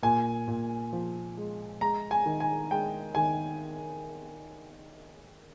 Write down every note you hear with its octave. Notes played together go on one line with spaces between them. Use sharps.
A#2 G#5
A#2
F3
G#3
G#3 A#5
G#5
D#3
G#5
G#3 G5
D#3 G#5